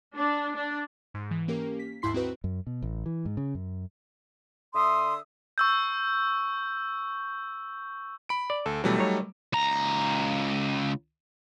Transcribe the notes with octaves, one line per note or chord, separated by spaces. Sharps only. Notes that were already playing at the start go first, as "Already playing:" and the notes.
D4
D4
G#2
E3
A#3 C#4 G4 A#4
B6
D#2 G#2 E4 C6 B6 C7
C4 D#4 F#4 B4
F#2
B2
A1
E3
G#2
C#3
F#2
D3 E5 C6 D#6
C#6 E6 G6
B5 D7
D5
D2 A4
B1 B2 E3 F#3 G3 A3
D#4 C#5
C#2 A#5